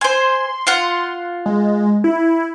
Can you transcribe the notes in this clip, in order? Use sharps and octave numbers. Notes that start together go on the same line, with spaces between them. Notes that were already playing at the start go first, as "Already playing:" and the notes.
C5 G#5 C6
F4 F5 F#5
G#3
E4